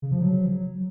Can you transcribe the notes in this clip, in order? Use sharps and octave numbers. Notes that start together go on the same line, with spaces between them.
C#3
F3
F#3